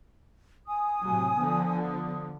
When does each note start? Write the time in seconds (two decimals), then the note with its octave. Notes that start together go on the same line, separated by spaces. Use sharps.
0.67 G#5 D#6
1.01 A2 C3 F#3
1.37 D3 F3 B3
1.80 D#6